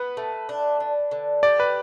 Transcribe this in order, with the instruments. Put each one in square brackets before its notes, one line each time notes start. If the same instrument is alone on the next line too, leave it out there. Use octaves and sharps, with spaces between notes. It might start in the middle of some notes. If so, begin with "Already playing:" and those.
Already playing: [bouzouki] B3 [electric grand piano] B4
[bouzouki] A3
D4
D4
D3
[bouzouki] G4 [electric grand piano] D5
[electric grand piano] B4